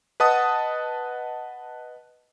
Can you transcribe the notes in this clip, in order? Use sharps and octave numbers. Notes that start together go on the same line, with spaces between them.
B4 D#5 F#5 A5 D#6